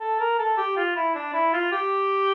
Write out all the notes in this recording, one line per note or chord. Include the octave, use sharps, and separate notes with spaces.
A4
A#4
A4
G4
F4
E4
D4
E4
F4
G4